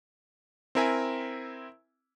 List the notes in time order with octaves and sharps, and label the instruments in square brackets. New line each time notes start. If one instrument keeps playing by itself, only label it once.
[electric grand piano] C4 E4 A#4 E5 G#5